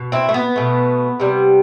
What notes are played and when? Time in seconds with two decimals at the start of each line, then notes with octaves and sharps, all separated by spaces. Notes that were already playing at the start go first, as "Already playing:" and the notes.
Already playing: B2
0.12 C4 E4
0.29 A3
0.34 B3
0.56 B2 A3
1.20 C3 G3